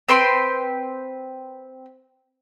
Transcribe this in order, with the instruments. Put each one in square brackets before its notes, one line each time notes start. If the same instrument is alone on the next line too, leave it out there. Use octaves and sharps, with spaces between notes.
[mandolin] C4 B4 G5 C6